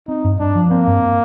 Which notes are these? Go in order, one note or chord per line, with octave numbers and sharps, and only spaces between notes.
C4 D#4
G2
G2 D4
F3
A#3 C4
G2